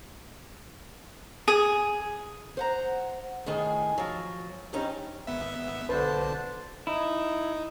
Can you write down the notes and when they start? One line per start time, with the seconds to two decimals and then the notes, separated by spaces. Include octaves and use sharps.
1.48 G#4
2.57 C5 F#5 A#5
3.46 A2 D#3 G#4 G#5
3.98 F3 F#3
4.73 G2 G3 C4 C#4 D#4
5.27 G#1 B3 E5
5.89 B1 D3 D4 B4 C5 A5
6.87 D#4 E4